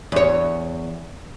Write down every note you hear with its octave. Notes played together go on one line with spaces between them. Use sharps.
E2 C#5